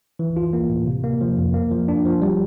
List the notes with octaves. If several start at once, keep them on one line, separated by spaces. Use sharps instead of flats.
E3
F4
A#3
A2
C3
A#3
F3
F2
A#3
F3
D4
F3
G3